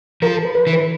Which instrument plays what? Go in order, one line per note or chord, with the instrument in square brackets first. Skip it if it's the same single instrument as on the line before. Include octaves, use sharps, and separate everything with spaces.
[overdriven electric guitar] F3 [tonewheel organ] A#4
[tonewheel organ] A4
B4
B4
[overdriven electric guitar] E3
[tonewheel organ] B4